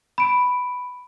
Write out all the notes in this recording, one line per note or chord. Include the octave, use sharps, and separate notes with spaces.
B5 D7